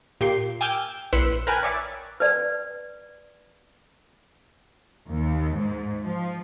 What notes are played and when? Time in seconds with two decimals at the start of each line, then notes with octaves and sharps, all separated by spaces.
0.21 A#2 G4 C6 C7
0.61 G5 G#5 D6 E6 F6 G6
1.13 A#1 E4 B4 C6 C#7 E7
1.47 A#4 B4 G5 G#5 F#6
1.63 C#5 D5 E5
2.20 B4 D5
5.10 D#2
5.56 G#2
6.03 F3